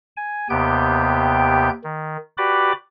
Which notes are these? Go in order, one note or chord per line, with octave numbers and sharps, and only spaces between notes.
G#5
D#2 C3 B3 G4 G5 G6
D#3
F#4 G4 B4 D5 B5 D6